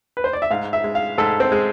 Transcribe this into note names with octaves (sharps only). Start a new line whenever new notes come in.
B4
C5
D5
E5
G#2 F5
E5
G#3
F5
G#2 A4
C4
G#3